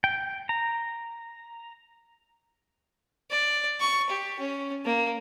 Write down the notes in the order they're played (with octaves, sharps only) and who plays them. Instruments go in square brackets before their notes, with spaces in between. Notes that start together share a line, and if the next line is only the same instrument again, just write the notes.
[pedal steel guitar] G5
A#5
[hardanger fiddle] D5
C#6
G4
C#4
A#3